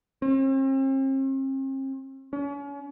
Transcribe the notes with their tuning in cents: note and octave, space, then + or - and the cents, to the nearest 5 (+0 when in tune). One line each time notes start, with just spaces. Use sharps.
C4 +45
C#4 +35